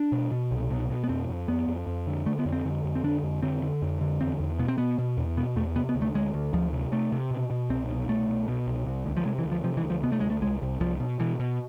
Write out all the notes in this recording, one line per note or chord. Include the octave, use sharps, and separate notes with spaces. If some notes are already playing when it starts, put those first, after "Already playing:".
Already playing: D4
B2
B2
C2
B2
B2
B3
F2 C4
F2
F2 B3
F2
F2
D3
D3 A3
B3
F2
C4
D3
F2
C4
D3 D4
F2
D3 C4
D3
F2
D3
E2 C4
E2
B2 B3
C4
B2 B3
B2
E2
B2 B3
E2 A3
C3 B3
B3
D2
A3
D2 G#3
D2
D2 F3
C3
C3 A3
C3
B2
B2
C2 C4
B2
C2 A3
B2
B2
C2
C3
D2
F3
C3 G#3
E3
D2
F3
C3 F3
E3
D2
F3
C3 B3
A3
D2 G#3
A3
C2 G#3
C2
C2 F3
B2
B2 E3
B2